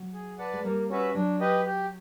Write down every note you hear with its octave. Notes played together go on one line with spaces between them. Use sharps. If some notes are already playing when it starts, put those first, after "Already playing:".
Already playing: F#3
G#4
B4 D5 F#5 A5
G#3
G3 A#3
C#4 F#4 B4 E5
F#3 D4
G4 B4 D#5
G4